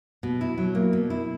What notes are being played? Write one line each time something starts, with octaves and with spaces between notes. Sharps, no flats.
B2
E4
F#3
A#3
B2
E4